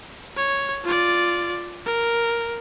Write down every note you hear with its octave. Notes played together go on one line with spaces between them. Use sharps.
C#5
F4 D5
A#4